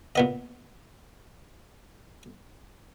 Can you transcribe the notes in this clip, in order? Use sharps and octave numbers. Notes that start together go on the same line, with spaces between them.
A#2 B3 D#5